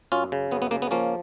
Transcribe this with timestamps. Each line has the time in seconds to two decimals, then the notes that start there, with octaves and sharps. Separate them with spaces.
0.12 F#2 C#4 F4
0.32 C#3
0.51 F#2 B3
0.62 B3
0.71 C#3 A#3
0.82 B3
0.91 F3 A#3 C#4